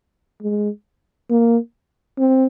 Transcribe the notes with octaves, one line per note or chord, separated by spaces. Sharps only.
G#3
A#3
C4